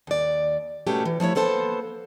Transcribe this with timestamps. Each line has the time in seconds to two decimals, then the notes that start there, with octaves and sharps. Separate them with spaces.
0.07 D#2 D5
0.87 B2 A3 A#3 C#4 F#4 G4
1.05 E3
1.20 F3 A3 E4 C#5
1.35 A#3 B3 A4 C5 A5